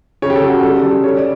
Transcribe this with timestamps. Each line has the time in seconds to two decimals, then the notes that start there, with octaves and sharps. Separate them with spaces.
0.22 C#3 C#5
0.30 G4
0.36 A4
0.43 C#3
0.49 F#4
0.62 G3 A4
0.77 A4
0.83 G3
0.91 A4
1.04 C#4 C#5
1.17 D5